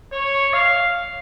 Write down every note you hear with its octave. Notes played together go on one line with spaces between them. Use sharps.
C#5
F5